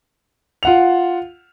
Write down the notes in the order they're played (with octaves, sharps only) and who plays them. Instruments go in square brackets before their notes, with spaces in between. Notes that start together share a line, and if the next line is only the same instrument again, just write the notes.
[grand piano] F4 F#5 F7